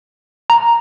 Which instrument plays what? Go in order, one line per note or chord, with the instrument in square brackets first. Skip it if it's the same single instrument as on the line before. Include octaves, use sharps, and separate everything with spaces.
[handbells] A#5